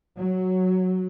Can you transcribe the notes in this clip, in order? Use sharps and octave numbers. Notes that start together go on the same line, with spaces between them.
F#3